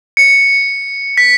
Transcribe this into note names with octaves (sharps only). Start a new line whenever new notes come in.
C#7
B6